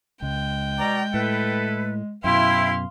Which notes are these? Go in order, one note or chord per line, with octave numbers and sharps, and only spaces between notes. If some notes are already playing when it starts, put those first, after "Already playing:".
C#2 G#3 G5
B2 D5 A#5
A2 E4 A4 B4
F#2 B2 E4 F5 G5 C6